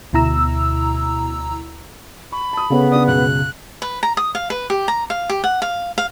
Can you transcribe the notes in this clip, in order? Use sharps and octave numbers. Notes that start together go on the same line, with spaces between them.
D2 B2 E4 A#5 E6
B5 C#6
A5 D#6
C#3 B3 G#4 A4 C#5
D4 D5 D#6
C#2 F#2 B2 F#6
B4
A#5
D#6
F5
B4
G4
A#5
F5
G4
F#5
F5
F5